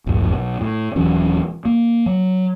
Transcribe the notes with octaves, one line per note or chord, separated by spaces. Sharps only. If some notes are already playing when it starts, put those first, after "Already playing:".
D1 A#1 G2
B1 B2
A2
D#1 E3 F#3 C#4
A#3
F#3